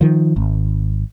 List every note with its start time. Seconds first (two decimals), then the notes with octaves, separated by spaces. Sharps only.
0.01 D#3 F3
0.36 G#1